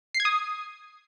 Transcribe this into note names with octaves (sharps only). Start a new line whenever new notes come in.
C7
G#6
D#6